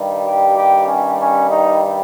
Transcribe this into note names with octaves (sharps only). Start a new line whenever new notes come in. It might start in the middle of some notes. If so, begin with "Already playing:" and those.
Already playing: G2 D#3 G3
G4
G4
C#4
C#4
D#4